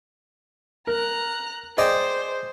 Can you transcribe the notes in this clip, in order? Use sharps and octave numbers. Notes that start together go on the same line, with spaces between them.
A#4 A#5 F#6
G#4 C5 D5 D#5 G5